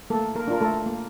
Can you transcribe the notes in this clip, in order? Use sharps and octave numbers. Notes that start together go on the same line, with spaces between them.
A3 A#3 A4
A#3 A#4
D4 F4 A#4
A3 A4
A#3